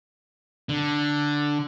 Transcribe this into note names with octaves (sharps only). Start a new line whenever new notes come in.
D3